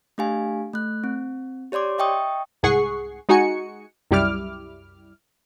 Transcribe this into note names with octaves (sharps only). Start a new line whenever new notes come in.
A3 D4 G4 F5 G#5
A3 F#6
C4
G4 C#5 D5 C6 D6
D#5 E5 G5 C#6 D#6
C2 G#2 G#4 F#5 C#6 C7
G#3 D#4 F#4 G#5 C#7
C2 F#2 G3 E4 D6 F6